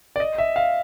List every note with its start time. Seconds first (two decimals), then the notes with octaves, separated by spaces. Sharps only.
0.16 D5
0.20 D#5
0.38 E5
0.56 F5